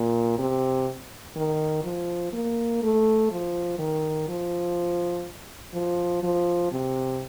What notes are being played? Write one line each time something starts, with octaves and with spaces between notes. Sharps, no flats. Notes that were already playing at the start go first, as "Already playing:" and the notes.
Already playing: A#2
C3
D#3
F3
A#3
A3
F3
D#3
F3
F3
F3
C3